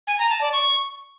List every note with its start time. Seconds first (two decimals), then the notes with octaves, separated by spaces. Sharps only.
0.07 G#5
0.19 A#5
0.30 A5
0.41 D5
0.53 C#6